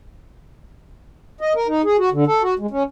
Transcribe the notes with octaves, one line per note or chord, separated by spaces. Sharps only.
D#5
A#4
D#4
G#4
F#4
D3
A4
F#4
G#3
C#4